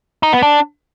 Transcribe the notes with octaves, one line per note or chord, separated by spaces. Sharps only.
D#4
B3
D4